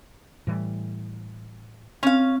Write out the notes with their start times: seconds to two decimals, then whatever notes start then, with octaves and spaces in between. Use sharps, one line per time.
0.47 A2 E3 G3
2.03 C4 C#4 F5